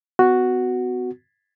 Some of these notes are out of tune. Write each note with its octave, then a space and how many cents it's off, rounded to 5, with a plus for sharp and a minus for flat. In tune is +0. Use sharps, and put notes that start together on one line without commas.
B3 +35 F#4 +0